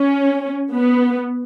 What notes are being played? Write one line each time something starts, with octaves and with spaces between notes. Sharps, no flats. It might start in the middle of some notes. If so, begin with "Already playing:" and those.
Already playing: C#4
B3